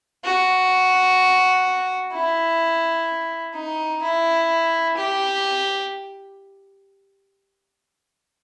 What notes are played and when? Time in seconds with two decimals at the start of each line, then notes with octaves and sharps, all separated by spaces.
0.25 F#4
2.13 E4
3.55 D#4
4.02 E4
4.97 G4